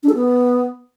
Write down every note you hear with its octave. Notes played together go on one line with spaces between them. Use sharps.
D4
A4
B3